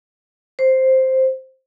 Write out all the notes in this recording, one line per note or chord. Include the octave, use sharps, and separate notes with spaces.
C5